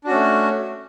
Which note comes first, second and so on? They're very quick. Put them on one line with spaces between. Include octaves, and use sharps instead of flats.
D4 F#4 C#4 A3